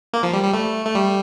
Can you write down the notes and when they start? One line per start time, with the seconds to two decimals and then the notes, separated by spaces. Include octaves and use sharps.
0.13 A#3
0.23 F3
0.33 G3
0.44 G3
0.54 A3
0.85 A3
0.95 G3